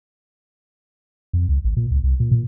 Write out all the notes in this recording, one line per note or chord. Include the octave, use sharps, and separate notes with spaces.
F2
C#2
A1
A#2
C#2
C2
A#2
A#2